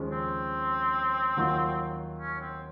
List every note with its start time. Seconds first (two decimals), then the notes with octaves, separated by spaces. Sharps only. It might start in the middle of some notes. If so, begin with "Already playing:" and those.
Already playing: D#2 C#3 F3 G#3 C#4
0.11 C4
1.37 D#2 D#3 F#3 A#3 F4
2.20 C#4
2.41 C4